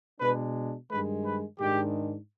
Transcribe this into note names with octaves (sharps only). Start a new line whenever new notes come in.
B2 G#3 D4 B4
G2 D#3 G#3 B4
B4
G#2 D#3 G#3 D4 G4